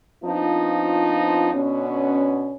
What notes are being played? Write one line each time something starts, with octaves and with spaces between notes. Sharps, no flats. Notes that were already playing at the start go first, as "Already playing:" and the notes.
F3 B3 C4 D4 D#4 F4
B2 D3 B3 C#4